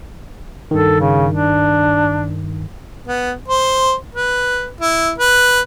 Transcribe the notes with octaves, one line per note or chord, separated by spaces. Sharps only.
G2 D#3 A4
C#3
D4
B3
C5
B4
E4
B4